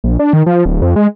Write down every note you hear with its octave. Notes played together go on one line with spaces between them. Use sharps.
A#1
D4
D#3
F3
D1
F2
G#3